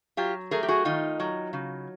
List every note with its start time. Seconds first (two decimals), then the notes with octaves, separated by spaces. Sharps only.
0.17 F#3 F4 G4
0.51 A3 G#4 A#4
0.63 G4
0.68 F#4 G#4
0.85 D#3 D#4 F4
1.20 F#3
1.53 C#3